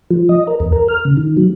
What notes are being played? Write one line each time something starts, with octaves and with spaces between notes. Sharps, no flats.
F3
D#5
A#4
E2
A#4
F6
C#3
D#3
F#3